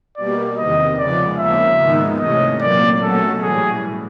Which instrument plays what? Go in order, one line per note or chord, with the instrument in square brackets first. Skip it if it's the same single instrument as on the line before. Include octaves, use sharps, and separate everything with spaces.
[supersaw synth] B2 G3 A#3 [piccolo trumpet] D5
[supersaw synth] E2 C3 D#3 [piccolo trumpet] D#5
[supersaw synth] C#3 F3 G#3 B3 [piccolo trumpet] D5
[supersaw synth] D#2 C#3 F3 A#3 [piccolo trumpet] E5
[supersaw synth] G#2 D#3 G#3 B3 D#4
[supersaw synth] C3 E3 A3 C#4 [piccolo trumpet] D#5
[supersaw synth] A#2 F#3 A#3 [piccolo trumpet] D5
[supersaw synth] B2 F#3 A3 C#4 F#4 [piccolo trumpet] A4
[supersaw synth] A2 E3 G3 [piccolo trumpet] G#4